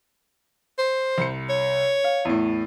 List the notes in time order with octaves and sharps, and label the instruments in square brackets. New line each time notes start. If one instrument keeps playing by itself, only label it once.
[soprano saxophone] C5
[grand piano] C2 C#7
[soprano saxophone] C#5
[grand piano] F5
E2 A2